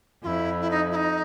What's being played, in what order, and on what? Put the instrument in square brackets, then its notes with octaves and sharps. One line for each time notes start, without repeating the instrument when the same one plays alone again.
[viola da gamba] F2 [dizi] E4 F4
[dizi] E4
D#4
E4
D#4